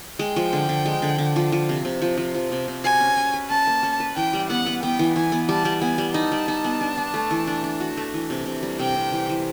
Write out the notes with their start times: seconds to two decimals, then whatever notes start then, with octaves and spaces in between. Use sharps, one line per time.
0.19 G#3 G5
0.36 F3
0.53 D3
0.69 D3
0.86 G#3
1.02 D3
1.18 D3
1.36 F3
1.52 F3
1.69 C3
1.85 C3
2.02 F3
2.17 F3
2.34 F3
2.52 C3
2.68 C3
2.84 F#4 G#5
3.00 C#4
3.17 C#4
3.34 B4
3.50 C#4 A5
3.67 A#3
3.83 C#4
4.00 B4
4.16 E3 G5
4.33 G3
4.50 B3 F#5
4.66 B3
4.83 B3 G5
4.99 E3
5.16 E3 G#5
5.32 B3
5.49 G3 A5
5.65 G3
5.82 B3 G#5
5.98 G3
6.14 D#4 A5
6.32 G3
6.48 D#4
6.64 B3
6.81 D4
6.97 D4
7.14 A3
7.31 E3
7.47 D4
7.64 D4
7.80 F#4
7.97 A3
8.14 E3
8.30 C3
8.46 C3
8.63 G3
8.79 C3 G5
8.96 C3
9.12 E3
9.29 E3